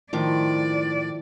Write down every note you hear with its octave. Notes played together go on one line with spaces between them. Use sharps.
A2 D#3 F3 D5 D6